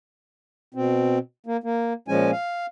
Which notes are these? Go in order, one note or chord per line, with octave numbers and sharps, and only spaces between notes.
B2 C4
A#3
A#3
A#2 F3 G#3 C#4 G#5
F5